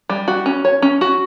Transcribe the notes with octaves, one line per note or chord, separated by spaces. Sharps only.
G3
F#4
C#4
C#5
C#4
F#4